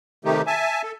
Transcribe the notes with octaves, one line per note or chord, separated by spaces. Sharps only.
C3 D#3 A3 D#4 G4
E5 G#5 A5
A4